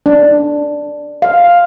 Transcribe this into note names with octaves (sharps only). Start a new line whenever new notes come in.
D4
F5